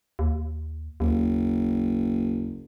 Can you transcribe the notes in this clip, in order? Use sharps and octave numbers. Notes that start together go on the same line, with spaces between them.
D#2
F#1 D#2